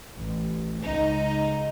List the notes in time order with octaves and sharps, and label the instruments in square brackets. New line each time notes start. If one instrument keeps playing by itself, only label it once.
[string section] A1
C#2 D#4